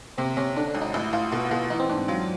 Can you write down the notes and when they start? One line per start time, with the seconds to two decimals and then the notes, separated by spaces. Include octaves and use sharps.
0.18 C3 C4
0.37 C3 C#4
0.56 D3 D4
0.68 D4
0.75 G#1
0.81 D#4
0.94 A1 E4
1.13 A1 F4
1.32 B2 F#4
1.51 B2 F4
1.70 E3 D#4
1.79 C4
1.89 G#2 D4
2.08 F#3 F4